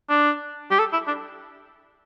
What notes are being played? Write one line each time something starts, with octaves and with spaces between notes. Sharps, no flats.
D4
G4
A4
E4
D4